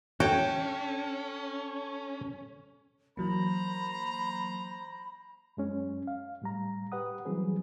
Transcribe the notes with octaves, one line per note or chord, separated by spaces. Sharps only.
C#4 F#4 A4 C#5 G5
E3 F#3 A#3 C5 A#5 B5
F#2 G#3 C#4
F5
A2 G3 A#5
G4 B4 F#5 D#6
E3 F#3 G3 C4 G#4 B4